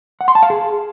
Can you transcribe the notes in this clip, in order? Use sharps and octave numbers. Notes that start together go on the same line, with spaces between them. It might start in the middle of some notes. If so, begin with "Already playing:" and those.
F#5
C6
A5
F5
G#4